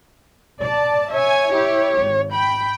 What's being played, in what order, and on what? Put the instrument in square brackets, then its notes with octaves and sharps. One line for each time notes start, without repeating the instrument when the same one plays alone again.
[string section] D5 A5
[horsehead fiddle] C#5 [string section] E5 G#5
[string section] E4 G4
G#1
[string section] G5 [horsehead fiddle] B5